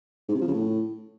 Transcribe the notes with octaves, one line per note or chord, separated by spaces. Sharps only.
G#2
C3
F3
C#3
A2